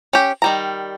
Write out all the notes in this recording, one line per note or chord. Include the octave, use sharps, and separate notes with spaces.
C#4 G4
D#3 G3 A#5